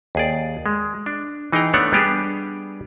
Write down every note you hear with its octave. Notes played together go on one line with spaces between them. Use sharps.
D#2 G#4 D5
G#3
D4
E3 D#4 G#4 G5 A#5
A3 B3 D4 A4 C#5 F#5
G3 B3 D4 G4 G#4